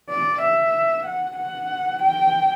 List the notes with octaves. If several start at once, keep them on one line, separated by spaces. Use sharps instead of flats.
D5
E5
F#5
F#5
G5